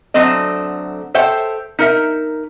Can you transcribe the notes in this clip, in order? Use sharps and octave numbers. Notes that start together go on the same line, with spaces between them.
D3 F#3 A3 C4 D#5
A4 C5 C#5 E5 G5
D#4 A#4 E5